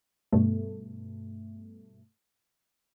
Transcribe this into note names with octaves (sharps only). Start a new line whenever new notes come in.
G2 B2 A3